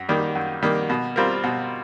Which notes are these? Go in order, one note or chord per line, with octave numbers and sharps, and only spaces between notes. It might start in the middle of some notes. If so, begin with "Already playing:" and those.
Already playing: F#2
D#3 G3 A#3
F#2
D#3 G3 A#3
B2
G3 C4 F4 A#4
B2